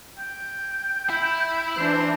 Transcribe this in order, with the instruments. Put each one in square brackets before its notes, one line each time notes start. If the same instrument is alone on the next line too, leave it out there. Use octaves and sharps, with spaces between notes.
[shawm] G5
[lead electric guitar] E4
[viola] E3 D4 [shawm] C5